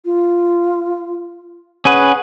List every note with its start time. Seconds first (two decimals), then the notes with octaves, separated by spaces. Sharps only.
0.05 F4
1.85 C#4 G#4 B4 F#5